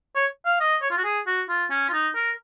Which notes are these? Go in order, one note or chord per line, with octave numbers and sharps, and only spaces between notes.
C#5
F5
D#5
C#5
F4
F#4
G#4
F#4
F4
C#4
F4
D#4
A#4